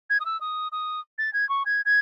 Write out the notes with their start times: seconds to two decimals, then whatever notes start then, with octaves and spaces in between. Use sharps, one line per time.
0.10 G#6
0.20 D#6
0.25 E6
0.41 D#6
0.72 D#6
1.18 A6
1.33 G#6
1.49 C#6
1.66 G#6
1.85 G#6